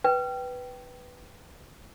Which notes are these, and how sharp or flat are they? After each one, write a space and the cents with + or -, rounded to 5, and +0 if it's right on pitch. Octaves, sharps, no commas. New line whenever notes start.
B4 +0 G5 -15